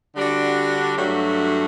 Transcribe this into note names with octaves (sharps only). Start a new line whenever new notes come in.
D3 G3 D4 F#4
G2 F#3 A3 D4 F#4